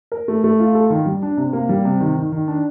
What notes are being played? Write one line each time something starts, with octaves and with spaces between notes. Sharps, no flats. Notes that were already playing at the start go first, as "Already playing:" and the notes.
A#4
A3
A3
F4
A4
D#3
G3
D4
C3
A#3
G3
C3
D#3
D#3
D#3
D4